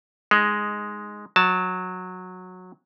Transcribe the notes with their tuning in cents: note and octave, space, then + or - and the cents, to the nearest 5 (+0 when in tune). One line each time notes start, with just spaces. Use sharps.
G#3 +0 D#4 +0
F#3 -15 A5 +0